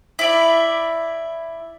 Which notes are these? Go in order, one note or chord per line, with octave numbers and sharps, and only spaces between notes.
E4 D5 E5